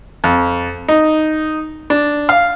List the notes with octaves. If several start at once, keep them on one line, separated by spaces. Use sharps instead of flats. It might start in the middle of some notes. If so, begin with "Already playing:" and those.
F2
D#4
D4
F5